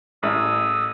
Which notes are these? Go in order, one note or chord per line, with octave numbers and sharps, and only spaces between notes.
A1 D#6 E6